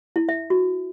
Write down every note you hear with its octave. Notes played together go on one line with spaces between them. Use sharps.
E4
E5
F#4